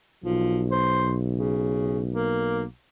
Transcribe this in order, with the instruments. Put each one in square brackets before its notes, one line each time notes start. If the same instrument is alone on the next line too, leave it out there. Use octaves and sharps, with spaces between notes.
[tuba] B1 [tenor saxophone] F3
[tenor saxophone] C5
C#3
A#3